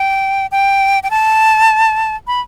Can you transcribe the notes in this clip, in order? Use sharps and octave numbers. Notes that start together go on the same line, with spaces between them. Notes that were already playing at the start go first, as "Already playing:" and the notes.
Already playing: G5
G5
G5
A5
B5